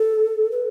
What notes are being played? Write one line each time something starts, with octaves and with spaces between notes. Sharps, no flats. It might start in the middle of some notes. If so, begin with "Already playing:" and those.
Already playing: A4
B4